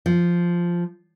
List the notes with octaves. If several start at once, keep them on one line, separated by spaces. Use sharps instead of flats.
F3